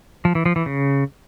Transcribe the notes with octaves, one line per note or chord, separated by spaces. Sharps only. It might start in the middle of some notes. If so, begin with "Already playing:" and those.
F3
E3
F3
E3
C#3